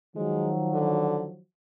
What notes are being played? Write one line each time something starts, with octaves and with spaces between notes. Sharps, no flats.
D#3 F3 F#3 G#3
D3